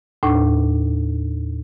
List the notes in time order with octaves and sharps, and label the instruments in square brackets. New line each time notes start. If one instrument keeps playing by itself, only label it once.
[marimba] D#2 A2 D4 C#6